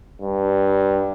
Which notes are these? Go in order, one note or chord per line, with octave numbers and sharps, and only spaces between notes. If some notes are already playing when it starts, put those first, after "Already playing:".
G2